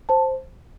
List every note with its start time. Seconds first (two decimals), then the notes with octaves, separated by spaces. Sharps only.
0.09 C5 A5